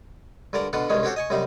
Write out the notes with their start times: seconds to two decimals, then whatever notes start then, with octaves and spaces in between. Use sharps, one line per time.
0.53 G2 D3 A#4 D5 A#5
0.73 B2 D3 D4 F4 F#5
0.89 C2 G2 D#3 G#3 C#4
1.03 C4 C#4 F#4 G4 A4 C5
1.16 D#5 G#5 C#6
1.30 F#2 C3 G3 D#4